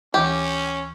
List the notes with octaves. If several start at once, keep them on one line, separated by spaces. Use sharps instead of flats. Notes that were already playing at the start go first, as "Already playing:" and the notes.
D2 E3 C#4 G4